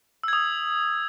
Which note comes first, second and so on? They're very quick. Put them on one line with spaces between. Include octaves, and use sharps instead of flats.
E6 G#6 D#6